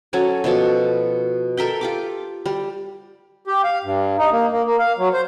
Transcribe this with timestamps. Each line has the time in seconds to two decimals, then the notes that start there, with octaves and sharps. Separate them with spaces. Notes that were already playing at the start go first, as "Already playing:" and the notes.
0.13 F#3 C#4 A4 G#5
0.44 B2 F3 A4 A5
1.57 A4 A#4 E5 G5
1.81 F4 G4 D6
2.46 G3
3.47 G4
3.64 F5
3.84 G2
4.18 D#4
4.32 A#3
4.51 A#3
4.65 A#3
4.79 F5
4.98 F#3
5.14 C5